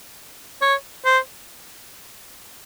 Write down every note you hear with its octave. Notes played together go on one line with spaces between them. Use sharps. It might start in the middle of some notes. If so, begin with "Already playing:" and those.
C#5
C5